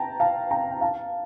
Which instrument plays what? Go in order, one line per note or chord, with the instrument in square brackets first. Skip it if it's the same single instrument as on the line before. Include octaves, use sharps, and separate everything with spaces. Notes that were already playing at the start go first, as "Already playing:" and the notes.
Already playing: [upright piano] G5 A5 A#5
F5 A5
G5 A#5
G5
F5 A5